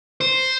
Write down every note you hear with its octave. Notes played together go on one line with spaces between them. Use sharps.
C5